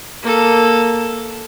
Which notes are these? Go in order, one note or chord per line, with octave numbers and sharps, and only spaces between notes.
A#3 A4